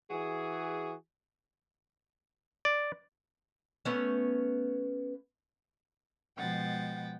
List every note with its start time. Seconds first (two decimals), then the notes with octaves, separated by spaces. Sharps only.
0.10 E3 F#4 G#4
2.65 D5
3.85 A3 B3 C#4
6.36 B2 F3 G#3 F#5 G5 A6